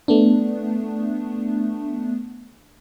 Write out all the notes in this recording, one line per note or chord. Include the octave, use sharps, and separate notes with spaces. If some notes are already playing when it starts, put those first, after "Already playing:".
A3 B3 D4